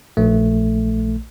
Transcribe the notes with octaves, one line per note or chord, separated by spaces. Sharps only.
A#1 A3